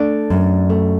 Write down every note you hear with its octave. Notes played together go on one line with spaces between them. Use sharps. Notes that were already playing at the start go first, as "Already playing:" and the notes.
Already playing: A3 D4 D5
F#2
A3